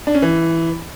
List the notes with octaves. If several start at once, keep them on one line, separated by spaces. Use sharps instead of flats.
D4
C#4
E3